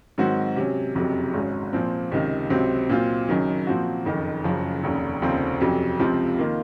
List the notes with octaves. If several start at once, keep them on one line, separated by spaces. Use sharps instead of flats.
G#2 D#3 F#3 C4 F#4
C3 F#3 C#4
F#1 F2 C3 F#3
G#1 G#2 F#3 C#4
A#2 F3 C4
C#2 C3 D#3
C#2 C3 F#3 C4
A#2 F#3 C4 F4
F#1 F#2 D#3 F#3
A#2 F3 C4 F#4
F#1 F2 D#3
F#1 F#2 C#3 F3
F1 D#2 C#3
F1 D#2 C#3 F3 C4
F2 C3 F#3 C#4
C#2 C3 F3 C4 F4
D#3 A#3 F4